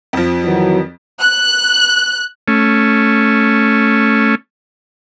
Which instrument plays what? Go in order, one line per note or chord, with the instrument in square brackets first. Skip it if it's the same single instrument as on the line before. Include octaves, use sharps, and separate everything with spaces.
[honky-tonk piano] F2 F3
[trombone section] D#3 E3 F#3
[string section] F#6
[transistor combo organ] A3 C#4